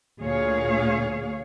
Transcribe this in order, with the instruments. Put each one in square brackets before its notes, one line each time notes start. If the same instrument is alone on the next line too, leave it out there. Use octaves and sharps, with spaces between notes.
[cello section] D2 A#2 G#4 C#5 F5